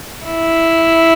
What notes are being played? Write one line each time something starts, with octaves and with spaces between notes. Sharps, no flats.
E4